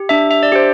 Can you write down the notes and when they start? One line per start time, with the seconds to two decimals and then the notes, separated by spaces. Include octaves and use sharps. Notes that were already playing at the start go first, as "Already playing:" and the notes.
Already playing: G4
0.09 D4 E5
0.31 E5
0.43 D5
0.52 G4 C5